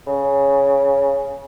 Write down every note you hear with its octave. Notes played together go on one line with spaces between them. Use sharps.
C#3